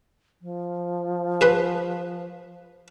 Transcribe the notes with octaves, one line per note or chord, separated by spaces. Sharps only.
F3
G#4 B4 C6